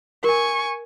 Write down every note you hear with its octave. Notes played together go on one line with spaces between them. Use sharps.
A#4 G#5 C#6